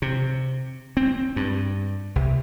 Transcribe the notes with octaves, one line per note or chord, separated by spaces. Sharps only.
C3
C4
G2
C2